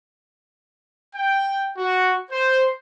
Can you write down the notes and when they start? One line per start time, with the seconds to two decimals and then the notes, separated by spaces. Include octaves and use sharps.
1.15 G5
1.78 F#4
2.31 C5